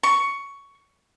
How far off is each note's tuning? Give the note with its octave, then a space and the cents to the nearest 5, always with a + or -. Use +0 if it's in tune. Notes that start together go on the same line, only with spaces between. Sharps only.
C#6 +10